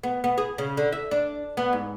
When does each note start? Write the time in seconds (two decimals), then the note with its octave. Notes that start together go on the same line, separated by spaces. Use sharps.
0.03 B3
0.24 B3
0.38 G#4
0.58 C#3
0.77 D3
0.92 E5
1.11 D4
1.57 B3
1.73 G#2